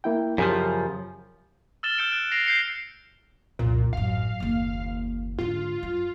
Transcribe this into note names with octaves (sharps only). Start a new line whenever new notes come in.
A#3 E4 G5
F#2 C#3 F3 G4
E6 F6 A6 E7 G7
E6 G6 A6 C#7 D7
F#6 A6 D7
A#6 C7 D7 F7
G6 C7 C#7
C2 F2 A#2
A1 F#2 F5
F#1 D#2
G#2 D3 F4
F#2